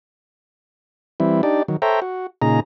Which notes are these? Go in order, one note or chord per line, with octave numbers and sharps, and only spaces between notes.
E3 G3 C4 E4
D4 D#4 G4 D5
D#3 F#3
A4 C5 C#5 E5 G5 A#5
F#4
A#2 C#3 D#4 G#4 A#5